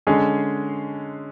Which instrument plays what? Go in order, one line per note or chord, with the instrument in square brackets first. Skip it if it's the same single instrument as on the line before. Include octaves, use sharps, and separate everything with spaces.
[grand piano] D3 G#3 C#4 G#4